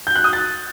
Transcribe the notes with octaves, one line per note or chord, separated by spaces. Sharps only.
G6
F#6
D#6
A6